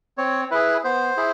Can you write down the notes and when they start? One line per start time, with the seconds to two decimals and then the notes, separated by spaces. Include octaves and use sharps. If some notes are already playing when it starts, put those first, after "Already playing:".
0.18 C4 C#5
0.51 E4 G#4 B4
0.84 B3 C5
1.17 E4 G#4